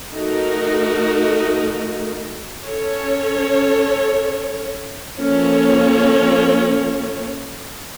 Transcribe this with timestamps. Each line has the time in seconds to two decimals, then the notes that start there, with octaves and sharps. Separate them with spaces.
0.14 A3 D#4 F#4 A#4
2.66 C#4 A4 C#5
5.19 F3 A#3 C#4 A4 C#5